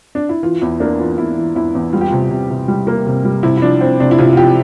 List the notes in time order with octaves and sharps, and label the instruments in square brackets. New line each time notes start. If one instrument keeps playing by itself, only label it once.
[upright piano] D4
E4
E3 F4
E2 E4
A#3 D4
E3 F4
E2 E4
E3
E2 E4
E2
G3 F4
G4
C3 F4
C3
C3
G3
A#3
C3
G3
C3 E4
E4
F3 D4
C4
C3 D4
E4
C3 F4
F4
F3 G4